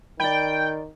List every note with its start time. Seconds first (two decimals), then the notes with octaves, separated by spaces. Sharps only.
0.20 D#3 D5 G5 B5